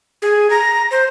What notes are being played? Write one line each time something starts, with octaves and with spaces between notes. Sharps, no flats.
G#4
A#5
C5